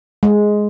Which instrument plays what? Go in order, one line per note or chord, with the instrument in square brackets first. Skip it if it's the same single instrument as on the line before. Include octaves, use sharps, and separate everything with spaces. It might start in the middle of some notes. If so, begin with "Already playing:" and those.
[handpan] G#3